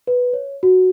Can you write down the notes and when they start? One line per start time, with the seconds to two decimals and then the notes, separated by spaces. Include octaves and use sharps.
0.07 B4
0.33 C#5
0.63 F#4